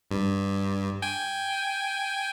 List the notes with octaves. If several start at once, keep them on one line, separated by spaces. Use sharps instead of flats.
G2
G5 G#5